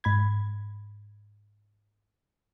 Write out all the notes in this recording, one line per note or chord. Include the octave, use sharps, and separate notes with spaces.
G#2 B5 G#6